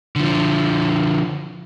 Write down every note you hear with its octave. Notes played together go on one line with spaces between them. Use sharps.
D3 F3